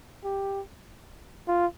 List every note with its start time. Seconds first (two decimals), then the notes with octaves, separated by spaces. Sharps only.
0.24 G4
1.48 F4